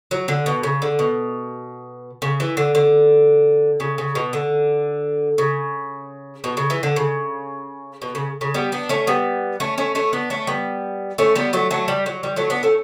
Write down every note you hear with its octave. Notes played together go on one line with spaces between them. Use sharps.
F#3
D3
B2
C#3
D3
B2
C#3
E3
D3
D3
C#3
C#3
B2
D3
C#3
B2
C#3
E3
D3
C#3
B2
C#3
C#3
G3 B3
B3 D4
A3 C#4
G3 B3
A3 C#4
A3 C#4
A3 C#4
B3 D4
A3 C#4
G3 B3
A3 C#4
G3 B3
F#3 A3
F#3 A3
G3
F#3
G3
F#3 A3
B3 D4
A3 C#4